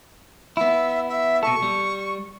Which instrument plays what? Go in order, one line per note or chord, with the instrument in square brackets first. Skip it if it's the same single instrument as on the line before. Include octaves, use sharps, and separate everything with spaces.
[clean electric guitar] B3 E4 [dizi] E5
[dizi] E5
[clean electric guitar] B2 A4 [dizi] C#6
[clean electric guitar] G3